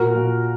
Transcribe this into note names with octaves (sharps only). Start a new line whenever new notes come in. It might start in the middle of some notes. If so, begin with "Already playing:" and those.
Already playing: A#2 F#4 A#4
A#2